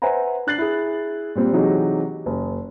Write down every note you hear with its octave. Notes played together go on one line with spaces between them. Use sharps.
B4 C5 E5 F#5 G#5 A#5
D4 F#6 A6 C7 F#7
E4 G#4
A#2 G3 C4
C3 E3 F#3 D#4 G4 G#4
F#1